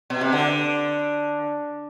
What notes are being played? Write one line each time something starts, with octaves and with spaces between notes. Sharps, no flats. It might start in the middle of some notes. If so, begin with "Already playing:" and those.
B2
C3
D3